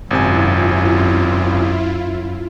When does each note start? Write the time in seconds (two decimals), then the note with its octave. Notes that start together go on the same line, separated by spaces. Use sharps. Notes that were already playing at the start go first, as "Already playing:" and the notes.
0.11 G#1 F#2 C3 E4 F4 G#5